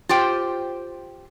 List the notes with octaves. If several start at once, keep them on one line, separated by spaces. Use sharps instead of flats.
F4 G4 C5 G5